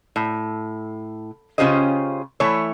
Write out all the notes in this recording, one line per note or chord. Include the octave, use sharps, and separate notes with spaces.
A2
C#3 C#4 F4 G4 C5 D#5
E3 A3 E4 C#5